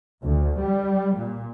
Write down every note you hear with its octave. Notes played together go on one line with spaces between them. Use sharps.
D2
G3
A#2